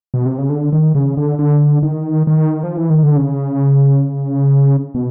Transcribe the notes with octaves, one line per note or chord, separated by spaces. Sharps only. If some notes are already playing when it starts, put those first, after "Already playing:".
B2
C3
C#3
D3
D#3
C#3
D3
D3
D#3
D#3
F3
E3
D#3
D3
C#3
B2